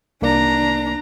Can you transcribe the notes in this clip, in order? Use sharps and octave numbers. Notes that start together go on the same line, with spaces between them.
C2 A#3 D4 D5 A#5